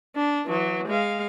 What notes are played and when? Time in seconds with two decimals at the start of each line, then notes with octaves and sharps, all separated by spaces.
0.16 D4
0.46 E3 F#3
0.87 G#3 F5